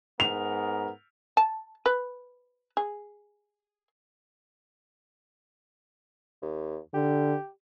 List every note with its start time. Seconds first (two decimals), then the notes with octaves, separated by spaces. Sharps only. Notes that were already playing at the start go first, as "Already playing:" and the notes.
0.20 G#2 B3 A#4 F7
1.37 A5
1.86 B4
2.77 G#4
6.42 D#2
6.94 D3 G4